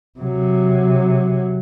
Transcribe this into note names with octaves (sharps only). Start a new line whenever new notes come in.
C3 F#3